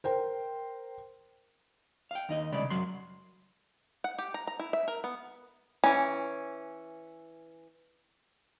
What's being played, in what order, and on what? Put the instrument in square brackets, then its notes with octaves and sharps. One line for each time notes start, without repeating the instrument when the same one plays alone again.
[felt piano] A#4 C5 G5
[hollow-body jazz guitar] F5 G5
D#2 D#4 D#5
C2 C#3 G#3 D5 B5
F#2 F#3 C6
[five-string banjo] F#5
G4
A#5
A#5
E4
E5
A#4
B3
E3 C#4